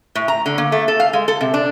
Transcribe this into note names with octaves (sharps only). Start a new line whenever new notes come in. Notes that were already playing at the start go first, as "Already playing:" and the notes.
A2
A#5
D3
A#3
A3
A4
F5
G#3
A4
C3
D4